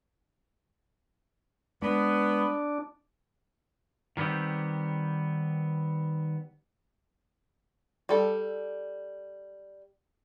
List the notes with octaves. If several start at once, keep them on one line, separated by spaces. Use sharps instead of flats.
G#3 B3 D4
D#3 G3 B3 C4 G4
G3 A4